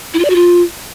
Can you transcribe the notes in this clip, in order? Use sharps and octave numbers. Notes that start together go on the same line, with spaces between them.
E4
F4
D5
F#4
F4